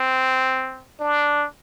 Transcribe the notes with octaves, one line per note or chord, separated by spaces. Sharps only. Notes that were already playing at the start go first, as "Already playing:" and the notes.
Already playing: C4
D4